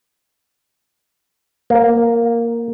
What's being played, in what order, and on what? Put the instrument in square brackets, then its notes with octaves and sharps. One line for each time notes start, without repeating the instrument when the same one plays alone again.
[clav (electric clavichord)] A#3